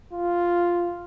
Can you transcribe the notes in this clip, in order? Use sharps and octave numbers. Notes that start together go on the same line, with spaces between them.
F4